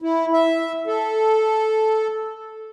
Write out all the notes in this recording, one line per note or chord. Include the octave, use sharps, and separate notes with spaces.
E4
E5
A4